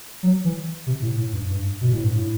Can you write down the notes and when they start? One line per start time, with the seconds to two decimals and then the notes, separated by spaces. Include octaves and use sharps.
0.23 F#3
0.44 E3
0.87 C3
1.02 A2
1.17 A2
1.33 G2
1.50 G2
1.81 B2
1.93 A2
2.04 G2
2.15 A2